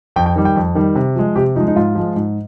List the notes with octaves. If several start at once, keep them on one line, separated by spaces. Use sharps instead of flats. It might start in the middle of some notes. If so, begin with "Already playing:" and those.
F2 G5
G5
D#3 G3
G5
F2
D#3 G3
C3
F3 G#3
C3 G4
F3 G#3 D#4
D#4
G#2 F4
F3 G#3
G#2